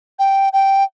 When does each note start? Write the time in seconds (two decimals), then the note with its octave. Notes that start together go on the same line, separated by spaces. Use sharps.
0.19 G5
0.53 G5